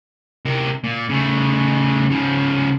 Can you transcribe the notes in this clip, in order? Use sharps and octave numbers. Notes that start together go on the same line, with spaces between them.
C3 A#4
A#2
C#3 A3
C#3 F3